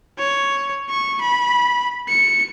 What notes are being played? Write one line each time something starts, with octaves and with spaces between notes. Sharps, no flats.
C#5
C#6
B5
C#7